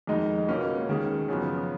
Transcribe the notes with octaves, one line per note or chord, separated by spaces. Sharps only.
F2 D#3 G#3 D#4
C#2 B2 A#3 C#4
D#2 D#3 G#3 C#4 G#4
F#2 C#3 F3 B3